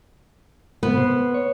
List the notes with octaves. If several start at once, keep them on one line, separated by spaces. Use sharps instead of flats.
C3 B3
C5
C#5